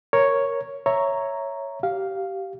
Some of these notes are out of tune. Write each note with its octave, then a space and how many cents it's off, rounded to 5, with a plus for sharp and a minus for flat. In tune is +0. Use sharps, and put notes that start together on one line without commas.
A#4 +0 C#5 +0
C#5 +0 E5 +0 A#5 +0
G4 -20 F5 +0